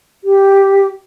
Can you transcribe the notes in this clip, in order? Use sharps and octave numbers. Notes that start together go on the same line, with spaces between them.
G4